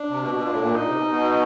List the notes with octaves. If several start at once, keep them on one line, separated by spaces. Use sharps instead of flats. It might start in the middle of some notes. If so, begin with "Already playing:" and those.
Already playing: D4
C3
B2
B2
A#2
A2
A#2
A#2 D#4
C3
B2
B2